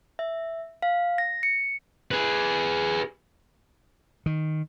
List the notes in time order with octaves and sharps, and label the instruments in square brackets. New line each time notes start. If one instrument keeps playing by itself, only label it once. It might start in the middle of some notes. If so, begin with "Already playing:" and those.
[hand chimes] E5
F5
A#6
C#7
[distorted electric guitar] G#4 B4
[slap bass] D#3